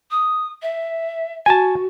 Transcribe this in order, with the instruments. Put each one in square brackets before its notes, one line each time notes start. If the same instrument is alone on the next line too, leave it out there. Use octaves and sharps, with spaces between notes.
[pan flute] D#6
E5
[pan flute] F#4 [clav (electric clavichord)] G#5 A5